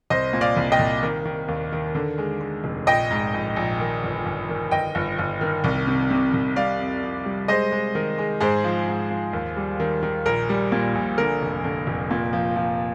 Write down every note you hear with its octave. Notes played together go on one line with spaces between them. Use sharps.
C2 C5 D#5
A#2
D5 F5
C2
D#5 G5
C2
D#3
D#3
D#2
D#3
D3
G#3
G#3
F1
A#1 D#5 G5
G#2
A#1
A#1
D#3
G1
G1
D#3
G1 D#5 G5
G1
G1
D#3
C2
C3
C3
C2
G3 D5 F5
F2
F2
G3
G#3 C5 D#5
G#3
D#3
G#3
G#2 G#4 C5
F3
G#2
F3
D#2
G3
D#3
D#3
A#1 A#4
G3
A#2
A#1
D3 A#4
F1
D3
F1
A#2
F3
F3